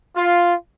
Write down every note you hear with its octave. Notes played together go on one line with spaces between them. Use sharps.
F4